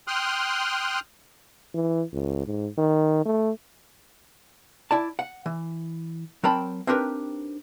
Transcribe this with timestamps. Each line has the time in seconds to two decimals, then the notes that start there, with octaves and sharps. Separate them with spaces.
0.08 G5 C6 D#6 F6 F#6
1.74 E3
2.13 C#2
2.47 G#2
2.78 D#3
3.25 A3
4.91 E4 D5 A5
5.19 F#5
5.46 E3
6.44 F#3 C4 A#4 G5 A5 B5
6.87 C4 D4 D#4 G4 A#4 B4